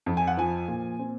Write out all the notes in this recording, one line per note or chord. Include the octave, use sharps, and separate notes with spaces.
F2
G#5
F#5
F3 G#5
A#2
C4